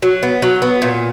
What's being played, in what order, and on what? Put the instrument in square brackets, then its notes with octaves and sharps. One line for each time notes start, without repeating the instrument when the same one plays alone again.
[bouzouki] F#3
B3
F#3
B3
A#2